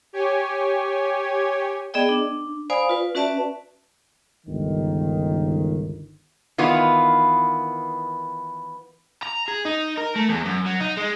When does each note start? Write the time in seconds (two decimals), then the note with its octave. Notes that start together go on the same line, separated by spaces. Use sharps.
0.13 G4 C#5 G#5
1.94 B3 G#4 D5 D#5 G5
2.09 D4
2.70 C5 D5 F5 G#5 B5 D#6
2.89 F4 B4
3.15 C#4 F#4 B4 D5 E5 A5
4.47 G1 C#2 D#3
6.58 D#3 E3 B3 F4
9.23 A#5
9.48 G#4
9.65 D#4
9.97 A#4
10.15 A3
10.29 E2
10.45 F#2
10.66 F#3
10.80 D#4
10.97 G#3